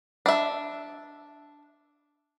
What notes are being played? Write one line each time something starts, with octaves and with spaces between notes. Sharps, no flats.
D4 E5